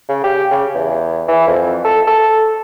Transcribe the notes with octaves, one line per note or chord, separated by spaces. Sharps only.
C#3
G4
C#3
E2
E3
F2
A4
A4